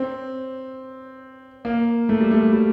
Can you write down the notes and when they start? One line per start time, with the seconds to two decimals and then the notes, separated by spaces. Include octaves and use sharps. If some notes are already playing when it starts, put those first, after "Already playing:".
Already playing: C4
1.65 A#3
2.09 A3
2.20 G3
2.31 A3
2.53 G3